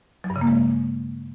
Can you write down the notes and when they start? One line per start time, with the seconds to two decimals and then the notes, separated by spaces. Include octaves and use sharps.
0.24 F#3
0.30 G2
0.36 C#3
0.41 A#3
0.47 G#3